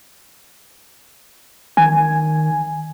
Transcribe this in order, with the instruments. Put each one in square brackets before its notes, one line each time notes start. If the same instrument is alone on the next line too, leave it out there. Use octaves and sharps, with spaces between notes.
[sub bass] D#3 [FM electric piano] G#5